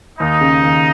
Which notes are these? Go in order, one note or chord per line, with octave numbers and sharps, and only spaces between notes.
D#2 D#4
C#3
D#2